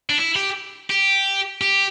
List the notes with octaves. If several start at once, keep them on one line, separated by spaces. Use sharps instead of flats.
D4
E4
G4
G4
G4